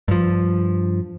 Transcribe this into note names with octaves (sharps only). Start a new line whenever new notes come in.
G2 F3